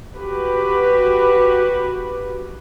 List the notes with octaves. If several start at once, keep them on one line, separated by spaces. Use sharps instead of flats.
F#4 G4 B4